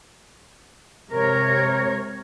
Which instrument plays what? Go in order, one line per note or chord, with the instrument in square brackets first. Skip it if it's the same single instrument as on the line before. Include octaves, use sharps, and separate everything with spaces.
[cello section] C3 G#3 A#4 C#5